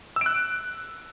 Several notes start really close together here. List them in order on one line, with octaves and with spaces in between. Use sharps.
E6 D7 F#6